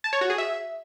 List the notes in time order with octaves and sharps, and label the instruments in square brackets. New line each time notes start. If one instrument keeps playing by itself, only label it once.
[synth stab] A5
C#5
F#4
G#4
E5